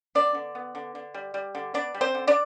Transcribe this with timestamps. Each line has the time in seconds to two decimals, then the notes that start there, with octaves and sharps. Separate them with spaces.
0.15 B3 D4 D5
0.34 D3
0.55 B3
0.75 D3
0.95 D3
1.14 G3
1.34 G3
1.55 D3
1.74 B3 D4 D5
1.94 G3
2.01 C4 C5
2.15 D3
2.27 D4 D5